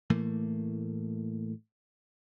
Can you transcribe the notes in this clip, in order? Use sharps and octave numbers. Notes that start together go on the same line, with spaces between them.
A2 E3 A3 A#3